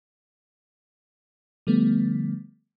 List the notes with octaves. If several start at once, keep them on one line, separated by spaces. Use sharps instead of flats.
D3 F3 G3 A3 B3